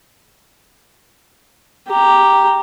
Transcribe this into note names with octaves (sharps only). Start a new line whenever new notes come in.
G4 A#5